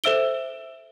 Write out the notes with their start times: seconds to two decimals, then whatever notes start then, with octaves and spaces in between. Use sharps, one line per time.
0.04 A4 C5 E5 E6 D7 G7